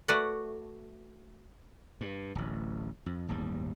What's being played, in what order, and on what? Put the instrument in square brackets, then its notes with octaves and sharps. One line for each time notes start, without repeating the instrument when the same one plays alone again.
[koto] A3 F#4 B4 D5 F#5
[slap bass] G2
D1 A1
F2
D1 G1 D#2 G3